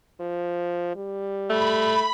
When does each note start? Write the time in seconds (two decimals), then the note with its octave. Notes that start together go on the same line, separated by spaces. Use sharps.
0.20 F3
0.96 G3
1.50 A3 B5